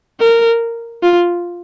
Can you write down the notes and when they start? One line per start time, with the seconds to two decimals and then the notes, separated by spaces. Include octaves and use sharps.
0.20 A#4
1.03 F4